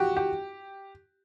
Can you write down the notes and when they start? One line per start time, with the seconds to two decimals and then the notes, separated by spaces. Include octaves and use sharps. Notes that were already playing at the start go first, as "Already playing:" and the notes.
Already playing: F#4 G4
0.17 G4